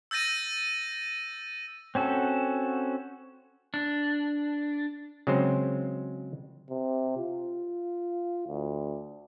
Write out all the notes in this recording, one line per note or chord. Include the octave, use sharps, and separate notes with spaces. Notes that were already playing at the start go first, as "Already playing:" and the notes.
E6 G6 A6 A#6 D#7
C4 C#4 F#4 A4
D4
C#3 F#3 G#3 C4 C5
C3
F4
D2